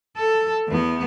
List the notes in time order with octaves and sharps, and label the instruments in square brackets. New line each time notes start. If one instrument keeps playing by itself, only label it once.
[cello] A4
E2 B3